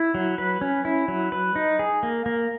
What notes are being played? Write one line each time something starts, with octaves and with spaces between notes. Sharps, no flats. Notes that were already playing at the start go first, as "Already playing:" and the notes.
Already playing: E4
F#3
B4
C#4
E4
F#3
B4
D#4
G#4
A#3
A#3